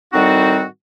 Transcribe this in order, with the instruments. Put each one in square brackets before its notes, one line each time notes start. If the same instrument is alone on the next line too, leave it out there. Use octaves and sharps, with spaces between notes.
[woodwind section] A2 D#3 G3 C4 D#4 F#4